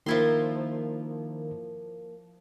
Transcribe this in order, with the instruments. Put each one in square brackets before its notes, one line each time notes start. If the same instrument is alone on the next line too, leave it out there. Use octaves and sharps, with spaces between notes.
[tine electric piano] D#3 F4 A#4 [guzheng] F3 E4 C6 [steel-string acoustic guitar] A#3